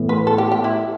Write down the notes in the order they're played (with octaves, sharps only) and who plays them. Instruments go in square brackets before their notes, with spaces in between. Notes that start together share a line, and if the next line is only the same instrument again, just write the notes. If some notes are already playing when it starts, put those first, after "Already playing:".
Already playing: [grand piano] A2 E3 B3
[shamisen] B4
A4
G4
G4
E4